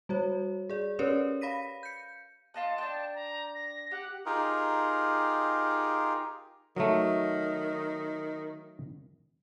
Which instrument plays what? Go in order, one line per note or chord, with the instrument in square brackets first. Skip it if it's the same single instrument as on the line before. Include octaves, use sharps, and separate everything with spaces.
[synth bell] G3 F#4 C#5
G#4 D5
C#4 G4 A#4 B4 C#5 D5
F5 B5 A#6 B6 D#7
G6 C#7
[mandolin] F4 D#5 F#5 [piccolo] A5
[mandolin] D4 G5
[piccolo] A#5
A#6
[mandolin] G4 [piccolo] F#5
[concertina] D#4 F4 G4 G#4 A#4
[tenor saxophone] D#3 [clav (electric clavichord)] F#3 A3